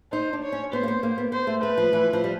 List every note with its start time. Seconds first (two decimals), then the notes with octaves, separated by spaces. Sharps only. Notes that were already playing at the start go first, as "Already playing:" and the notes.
0.12 D#4 C5
0.33 D4
0.43 C#5
0.52 C#4
0.72 B3 C5
0.83 A#3
0.88 B3
1.03 A#3
1.18 B3
1.32 B3 C5
1.47 A3
1.62 A3 B4
1.78 F3
1.93 E3
2.13 F3
2.24 G3